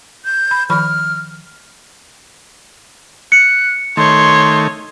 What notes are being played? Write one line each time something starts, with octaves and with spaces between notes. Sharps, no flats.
G6
B5
D#3 F3 B5 F6
F#6 C#7
D#3 A3 C#5 C6